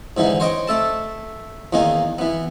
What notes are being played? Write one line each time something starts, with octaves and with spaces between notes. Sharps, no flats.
G#2 D3 E3 D#4
C5 C#5 D#5 G5
A3 A4 A5
E2 D#3 A#3 D#4 G#5
E3 B3